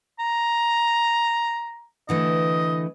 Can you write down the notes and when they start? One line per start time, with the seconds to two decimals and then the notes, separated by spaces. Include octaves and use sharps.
0.19 A#5
2.09 D3 E3 A3 D#5